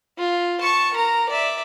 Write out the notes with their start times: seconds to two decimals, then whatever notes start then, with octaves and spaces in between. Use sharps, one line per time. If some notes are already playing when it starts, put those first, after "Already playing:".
0.18 F4
0.60 A5 C#6
0.94 A#4 A#5
1.29 D5 E5